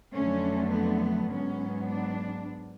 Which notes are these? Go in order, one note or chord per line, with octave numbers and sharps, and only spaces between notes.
F2 D3 F#3 A3 C#4
B3
G#2 F#3 B3 C#4
D4